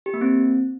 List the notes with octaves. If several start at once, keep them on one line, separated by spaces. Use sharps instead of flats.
G4
A#3
C4